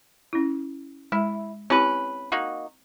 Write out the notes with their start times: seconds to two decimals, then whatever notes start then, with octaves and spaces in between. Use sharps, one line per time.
0.33 C#4 E4
1.12 G#3 E4
1.70 C4 C#4 E4 G4 B4
2.32 A#3 D#4 F#4